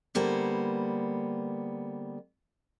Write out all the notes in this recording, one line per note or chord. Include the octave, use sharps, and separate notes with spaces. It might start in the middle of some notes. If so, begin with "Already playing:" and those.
D3 G3 A#3 B3 C5